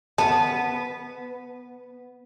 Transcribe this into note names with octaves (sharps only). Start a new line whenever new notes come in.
B3 A5